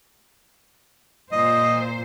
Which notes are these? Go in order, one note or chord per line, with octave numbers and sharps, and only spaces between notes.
A#2 C5 D#5